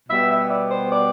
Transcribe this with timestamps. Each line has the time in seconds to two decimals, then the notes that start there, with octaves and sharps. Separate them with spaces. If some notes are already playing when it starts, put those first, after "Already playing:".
0.09 B2 G3 B3 E5
0.30 E5
0.51 D5
0.70 C5
0.91 D5